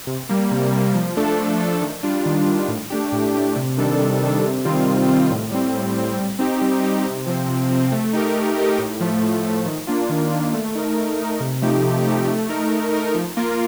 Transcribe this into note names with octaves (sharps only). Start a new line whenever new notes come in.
C3
G3 A#3
C3
G3 A#3
F3
A3 D4 A4
F3
A3 D4 A4
D#3
G3 D4 F4
D#3
G3 D4 F4
A2
A3 D4 G4
A2
A3 D4 G4
C3
D#3 G3 D4 A4
C3
D#3 G3 D4 A4
C3
D#3 G3 C4 F4
C3
D#3 G3 C4 F4
A2
G3 C4
A2
G3 C4
G3
C4 D#4 G4
G3
C4 D#4 G4
C3
F3 C4
C3
F3 C4
A3
D#4 G4 A#4
A3
D#4 G4 A#4
A2
F3 A3
A2
F3 A3
D#3
A#3 D4 F4
D#3
A#3 D4 F4
A3
D#4 A#4
A3
D#4 A#4
C3
F3 A3 D#4 G4
C3
F3 A3 D#4 G4
A3
D#4 A#4
A3
D#4 A#4
F3
A#3 F4 A#4